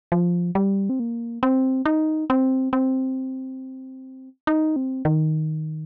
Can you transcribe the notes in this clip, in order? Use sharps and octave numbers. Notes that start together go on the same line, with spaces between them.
F3
G3
C4
A#3
C4
D#4
C4
C4
D#4
C4
D#3